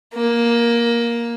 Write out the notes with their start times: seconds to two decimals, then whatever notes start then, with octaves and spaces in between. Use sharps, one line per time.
0.14 A#3